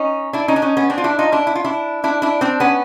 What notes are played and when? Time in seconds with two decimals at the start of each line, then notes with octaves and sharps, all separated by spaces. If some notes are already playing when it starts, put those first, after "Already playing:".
Already playing: C#4 D#4
0.33 D4 E4
0.48 C#4 D#4
0.56 D4
0.62 C#4 D#4
0.77 B3 C#4
0.90 C4 D4
0.98 F4
1.04 D4 E4
1.19 D#4 F4
1.32 D4 E4
1.47 E4
1.55 F4
1.64 D4 E4
2.04 D4 E4
2.22 D4 E4
2.41 C4 D4
2.60 B3 C#4